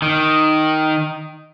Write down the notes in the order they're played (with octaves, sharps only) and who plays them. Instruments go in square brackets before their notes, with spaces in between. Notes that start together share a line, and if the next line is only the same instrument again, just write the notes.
[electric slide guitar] D#3